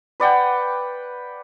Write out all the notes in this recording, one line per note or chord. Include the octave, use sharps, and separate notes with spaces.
B4 D5 F#5 G5